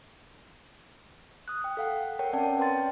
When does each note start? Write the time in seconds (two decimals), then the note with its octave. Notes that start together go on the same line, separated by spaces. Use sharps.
1.48 D#6 F#6
1.62 G5 F#6
1.77 A4 F5 F#5
2.19 A#4 C#5 F#5 G5
2.33 C4 C#4 A#4 D5 F#5 A5
2.58 B4 C#5 G5 A5 C6 A6